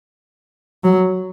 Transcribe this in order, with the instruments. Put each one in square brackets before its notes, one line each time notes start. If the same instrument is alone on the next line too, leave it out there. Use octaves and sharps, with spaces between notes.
[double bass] F#3